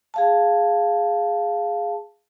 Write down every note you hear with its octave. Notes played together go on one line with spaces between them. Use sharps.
G#4 F5 A5